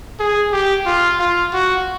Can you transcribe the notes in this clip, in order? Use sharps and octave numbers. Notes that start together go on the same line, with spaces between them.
G#4
G4
F4
F4
F#4